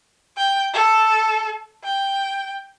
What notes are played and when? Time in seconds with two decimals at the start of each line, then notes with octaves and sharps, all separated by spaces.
0.37 G5
0.73 A4
1.84 G5